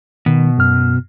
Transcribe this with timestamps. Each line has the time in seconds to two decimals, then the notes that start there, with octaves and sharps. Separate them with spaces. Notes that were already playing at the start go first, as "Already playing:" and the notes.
0.26 B2 D#3
0.58 F#2 F6